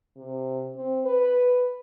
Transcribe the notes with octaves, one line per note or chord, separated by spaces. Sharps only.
C3
C4
B4